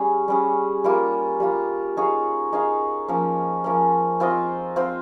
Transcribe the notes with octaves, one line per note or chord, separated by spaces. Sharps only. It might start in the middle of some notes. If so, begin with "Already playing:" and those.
Already playing: G3 C#4 G#4
G3 C#4 G#4
G3 A#3 F4
G3 A#3 F4
D#4 G#4 C#5 F5
D#4 G#4 C#5 F5
F3 A#3 C#4
F3 A#3 C#4
C4 F4 C5 D#5
C4 F4 C5 D#5